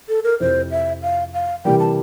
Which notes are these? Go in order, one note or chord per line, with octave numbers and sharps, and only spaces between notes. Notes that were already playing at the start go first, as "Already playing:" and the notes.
A4
A#4
F2 C3 F3 C4 E4 C5
E5
F5
F5
C3 E3 G3 A#3 G5
A5